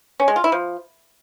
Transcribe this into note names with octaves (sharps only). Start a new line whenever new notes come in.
C#4
G#3
F4
E4
F3